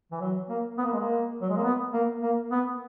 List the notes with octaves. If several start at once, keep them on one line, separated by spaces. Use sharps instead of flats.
E3
F#3
A#3
B3
A#3
G#3
A#3
F#3
G#3
A#3
B3
A#3
A#3
B3